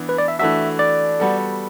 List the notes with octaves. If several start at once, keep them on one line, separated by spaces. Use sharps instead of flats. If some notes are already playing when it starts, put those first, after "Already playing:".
Already playing: E3 B3 D4
B4
D5
E5
E3 A3 D4 F#4 E5
D5
G3 B3 F#4 A4